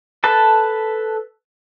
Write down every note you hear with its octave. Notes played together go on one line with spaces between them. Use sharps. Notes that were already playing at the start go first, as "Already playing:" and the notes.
A4 B4 A5